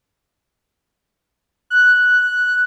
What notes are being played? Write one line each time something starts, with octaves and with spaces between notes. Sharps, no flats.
F#6